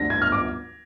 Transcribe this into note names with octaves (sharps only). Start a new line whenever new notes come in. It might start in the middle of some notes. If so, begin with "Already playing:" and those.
Already playing: D2 D3 G3 D4 A#6
G#6
F6
D6